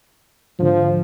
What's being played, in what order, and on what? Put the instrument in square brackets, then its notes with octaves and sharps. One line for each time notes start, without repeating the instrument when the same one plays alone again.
[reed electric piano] G#2 D3 [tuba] F3